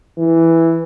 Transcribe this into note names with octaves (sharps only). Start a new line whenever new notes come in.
E3